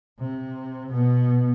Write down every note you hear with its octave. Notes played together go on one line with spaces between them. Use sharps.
C3
B2 B3